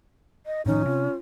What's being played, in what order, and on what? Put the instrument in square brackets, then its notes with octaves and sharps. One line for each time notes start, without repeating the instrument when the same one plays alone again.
[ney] D#5
[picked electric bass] A2 D#3 F3 [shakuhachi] C#4 [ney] D#4
[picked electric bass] C3 [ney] F4